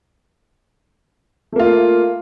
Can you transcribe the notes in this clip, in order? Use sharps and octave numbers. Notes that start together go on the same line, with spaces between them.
A3 A#3 F4